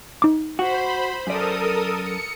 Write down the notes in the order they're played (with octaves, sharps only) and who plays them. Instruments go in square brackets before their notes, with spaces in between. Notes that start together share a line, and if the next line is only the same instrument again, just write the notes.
[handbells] D#4 D6
[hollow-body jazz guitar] F#4 [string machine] C5 B5
[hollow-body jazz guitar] F#2 D5 [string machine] A4 A#4 D#6
[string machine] C#7